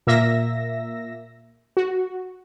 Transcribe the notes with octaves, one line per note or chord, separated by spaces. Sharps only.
A#2 A#3 E5 E6 A#6
F#4